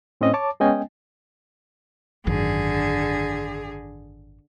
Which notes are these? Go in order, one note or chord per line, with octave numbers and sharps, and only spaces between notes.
A2 C4 C#4 D#5
C#5 A5 D6
G#3 B3 C#4 D#5 G5 G#5
G#1 F#2 D3 D#3 G#4